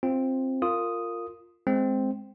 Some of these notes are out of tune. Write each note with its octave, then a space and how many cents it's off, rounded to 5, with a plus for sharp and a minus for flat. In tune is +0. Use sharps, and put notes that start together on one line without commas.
C4 +10 F4 +0
F4 +0 A#4 -20 D#6 +0
G#3 +5 C4 +0